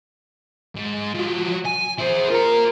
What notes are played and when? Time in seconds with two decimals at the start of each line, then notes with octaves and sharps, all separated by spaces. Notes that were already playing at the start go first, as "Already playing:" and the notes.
0.75 G#2
1.14 F3 F#3
1.65 G#5
1.99 E4 G#4 C5
2.31 F4 A#4 A#5